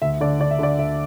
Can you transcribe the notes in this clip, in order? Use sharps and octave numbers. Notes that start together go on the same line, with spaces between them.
D2 E5
D3 D5
D3 D5
E5
D3 D5
D2 E5